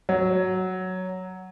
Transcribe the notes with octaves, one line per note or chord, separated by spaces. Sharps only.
F#3